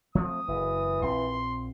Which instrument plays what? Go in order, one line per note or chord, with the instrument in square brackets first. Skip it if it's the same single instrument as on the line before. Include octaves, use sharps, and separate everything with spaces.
[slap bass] F3 A3 C4 [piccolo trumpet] D#6
[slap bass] F#1 [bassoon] E3
[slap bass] A#1 C4 [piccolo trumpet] C6